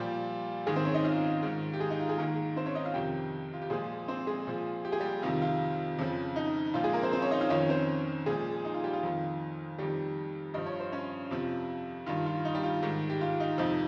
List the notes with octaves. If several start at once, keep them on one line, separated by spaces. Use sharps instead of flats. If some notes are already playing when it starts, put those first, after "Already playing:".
Already playing: A#2 F3 G3 G4
G#2 D#3 G#3 G#4
C4 C5
C#4 C#5
D#4 D#5
F4 F5
G#2 D#3
G4
G#3 G#4
D#4
F4
G#3 G#4
G#2 D#3 A#3 A#4
C4 C5
C#4 C#5
D#4 D#5
F4 F5
F2 C3 D#3 G4 G5
F4
G4
A#2 F3 G#3 G#4
C4 C5
G#3 G#4
A#2 F3
G4
G#4
G3 G4
F2 C3 D#3 F4
F4
F2 C#3 F3
D#4
A#2 F3 F4
G#3 G#4
A#3 A#4
C4 C5
C4 C5
C#4 C#5
D#4 D#5
F4 F5
F2 D#3 C#4 C#5
C4 C5
A#2 F3 G#3 G#4
D#4
F4
G3 G4
F4
F2 D#3
F2 D#3 G3 G4
G2 F3 D#5
C#5
C5
C#4 C#5
F2 C3 F3
G2 D#3 F4
F4
D#4
G3 G4
F4
G#2 D#3
G4
F4
D#4
F2 C3 F3 D#4